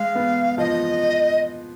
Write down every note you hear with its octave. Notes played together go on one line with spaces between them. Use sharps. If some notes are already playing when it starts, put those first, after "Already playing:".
Already playing: G#3 F5
B3
F3 D#5